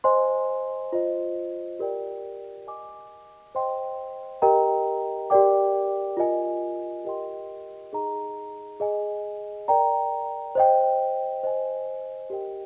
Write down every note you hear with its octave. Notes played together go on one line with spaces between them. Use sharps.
C5 D#5 G#5 C6
F4 C5 D#5
G4 A#4 D5 G5
A#4 D#5 G#5 D6
C5 D#5 G5 C6
G4 A#4 D#5 G5 A#5
G4 A#4 D5 G5 D6
F4 A#4 D#5 G#5
G4 A#4 D#5 G5 C6
D#4 G#4 D#5 A#5
G#4 D#5 G#5
A#4 D5 G5 A#5
C5 D#5 G5
C5 D#5 G#5
G4 A#4 D#5 G5